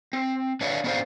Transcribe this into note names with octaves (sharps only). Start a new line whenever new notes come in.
C4
D4 B4 C#5 E5 F5
B3 C#4 D4 A#4 C5 F5